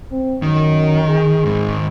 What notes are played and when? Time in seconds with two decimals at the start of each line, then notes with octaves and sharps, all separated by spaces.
0.12 C4
0.42 F#2 D#3
1.09 G#4
1.45 G#2 D#3